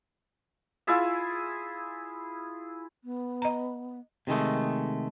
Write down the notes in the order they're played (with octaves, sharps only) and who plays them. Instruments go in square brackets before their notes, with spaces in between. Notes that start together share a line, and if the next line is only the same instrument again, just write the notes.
[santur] E4 F4 G#4 E5
[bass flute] B3
[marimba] D#5 A#5
[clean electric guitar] C3 D#3 G#3 A3